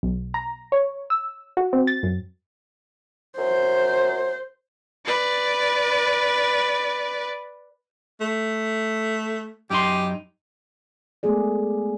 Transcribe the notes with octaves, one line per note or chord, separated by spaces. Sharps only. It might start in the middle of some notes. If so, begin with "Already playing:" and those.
B1
A#5
C#5
E6
F#4
C4
A6
F#2
F#2 C5
B4 D5
A3
F#2 D#4 G4 C6
G#3 A3 B3 G#4 D5